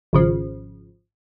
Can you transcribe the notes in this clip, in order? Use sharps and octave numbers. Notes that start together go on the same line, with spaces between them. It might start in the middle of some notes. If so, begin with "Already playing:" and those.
G#1 C#3 F3